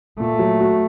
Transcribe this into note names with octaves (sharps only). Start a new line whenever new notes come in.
A#2 A3
F#3
F#4